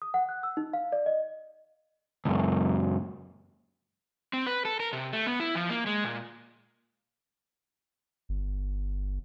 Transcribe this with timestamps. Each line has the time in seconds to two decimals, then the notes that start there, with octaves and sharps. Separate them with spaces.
0.02 D#6
0.14 F#5
0.29 F#6
0.43 E6
0.57 D#4
0.73 F5
0.92 D5
1.06 D#5
2.25 C#2 F#2
4.33 C4
4.47 B4
4.65 A4
4.80 A#4
4.93 C3
5.13 A3
5.27 B3
5.40 E4
5.55 F3
5.70 A#3
5.86 G#3
6.04 A#2
8.29 G1